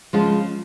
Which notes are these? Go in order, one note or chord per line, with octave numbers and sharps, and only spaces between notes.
C#3 F3 G#3 C#4 F4